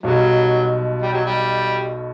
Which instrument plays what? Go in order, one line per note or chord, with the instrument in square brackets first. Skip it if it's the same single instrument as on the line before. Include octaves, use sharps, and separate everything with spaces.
[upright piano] B1 B2 G3 [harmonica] F#3
[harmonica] G3
F#3
G3